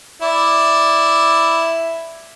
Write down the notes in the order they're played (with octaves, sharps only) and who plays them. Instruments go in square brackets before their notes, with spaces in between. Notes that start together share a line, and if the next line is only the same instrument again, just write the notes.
[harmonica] E4 D5